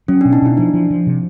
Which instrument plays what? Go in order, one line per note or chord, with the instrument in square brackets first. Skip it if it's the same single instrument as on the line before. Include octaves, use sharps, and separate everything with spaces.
[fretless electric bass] F#3 [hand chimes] C#4
[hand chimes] D4
[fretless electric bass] B2
[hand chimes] D#4
[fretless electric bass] B2 [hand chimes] E4
[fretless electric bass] F3 [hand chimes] D4
[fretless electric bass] F3
F3
C3